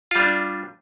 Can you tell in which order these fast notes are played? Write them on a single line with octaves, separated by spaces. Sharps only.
F4 G3 D4